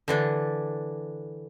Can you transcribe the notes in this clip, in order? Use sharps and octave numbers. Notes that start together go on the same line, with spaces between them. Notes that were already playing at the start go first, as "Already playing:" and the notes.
D3 E3 D4